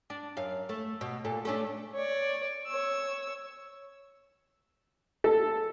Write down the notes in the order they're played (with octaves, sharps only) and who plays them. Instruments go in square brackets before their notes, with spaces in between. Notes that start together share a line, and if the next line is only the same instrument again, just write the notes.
[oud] D4
F#2 F5
A3
B2
A#2 A4
A3 C#4 D4
[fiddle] C#5 D5
C#5 E6
[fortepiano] A4